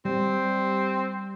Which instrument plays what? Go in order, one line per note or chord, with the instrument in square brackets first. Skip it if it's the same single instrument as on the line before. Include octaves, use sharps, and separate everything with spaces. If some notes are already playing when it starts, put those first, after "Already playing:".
[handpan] G3 [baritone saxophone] C4